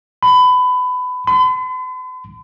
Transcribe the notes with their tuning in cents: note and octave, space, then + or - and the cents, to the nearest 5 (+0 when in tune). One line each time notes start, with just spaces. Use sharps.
B5 +20
B5 +45